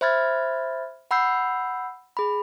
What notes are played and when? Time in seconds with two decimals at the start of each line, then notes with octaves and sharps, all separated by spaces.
0.01 C5 E5 B5 F6 G#6 A6
1.11 F#5 B5 E6 G6 C7
2.17 G#4 B5